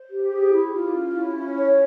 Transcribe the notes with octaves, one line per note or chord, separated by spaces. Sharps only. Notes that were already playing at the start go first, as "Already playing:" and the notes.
Already playing: C5
G4
G#4
E4
F4
C#4
E4
C#4
C#5